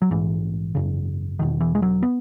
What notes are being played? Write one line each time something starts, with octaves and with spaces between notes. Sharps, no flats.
F#3
A#1 G#2 E3
G#1 F#2 C#3
E1 E2 B2 D#3
E3
G#3
F#3
B3